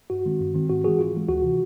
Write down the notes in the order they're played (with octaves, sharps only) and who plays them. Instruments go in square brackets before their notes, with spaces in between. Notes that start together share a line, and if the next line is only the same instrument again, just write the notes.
[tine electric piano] G2 F#4
D#3 G#3 C4
G2
D#3 G#3 C4
G#2 F#4
E3 G#3 F#4 G#4
G#2 F4
E3 G#3
D2 F#4
C3 E3